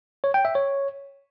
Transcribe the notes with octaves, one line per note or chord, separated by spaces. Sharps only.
C#5
G5
E5
C#5